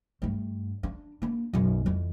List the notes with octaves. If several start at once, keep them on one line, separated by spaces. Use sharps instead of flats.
G2 A3
D4
A#3 D4
B1 F#2
F2 E3